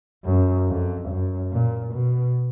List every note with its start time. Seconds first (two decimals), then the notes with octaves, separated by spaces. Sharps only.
0.25 F#2
0.67 F2
1.09 F#2
1.52 A#2
1.94 B2